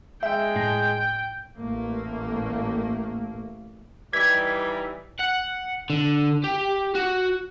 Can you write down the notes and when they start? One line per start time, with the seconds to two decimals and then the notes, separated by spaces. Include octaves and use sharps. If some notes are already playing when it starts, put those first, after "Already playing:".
0.23 G#3 E5 G5
0.56 A2
1.58 A1 A3 A#3
4.13 E3 G3 D#4 G#6 B6
5.20 F#5
5.90 D3
6.44 G4
6.95 F#4